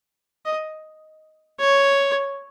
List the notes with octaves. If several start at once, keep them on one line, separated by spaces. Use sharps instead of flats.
D#5
C#5